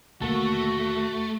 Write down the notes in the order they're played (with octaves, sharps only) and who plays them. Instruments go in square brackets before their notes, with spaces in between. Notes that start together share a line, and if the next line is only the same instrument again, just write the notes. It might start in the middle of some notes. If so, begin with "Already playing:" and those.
[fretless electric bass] D#2 B2 D3 [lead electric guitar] A3 [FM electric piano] A#3 A5 [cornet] F#4